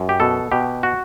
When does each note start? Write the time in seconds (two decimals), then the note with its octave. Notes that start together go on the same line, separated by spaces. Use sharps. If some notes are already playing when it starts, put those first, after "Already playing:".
Already playing: F#2
0.09 G4
0.20 B2 A4
0.52 B2 G4
0.83 F#4